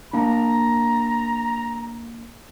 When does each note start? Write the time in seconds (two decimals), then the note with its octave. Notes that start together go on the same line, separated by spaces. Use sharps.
0.13 A#3 D4 A#5